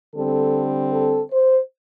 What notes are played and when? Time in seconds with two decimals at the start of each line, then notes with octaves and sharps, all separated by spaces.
0.15 D3 G3 C4 A4
0.93 A4
1.32 C5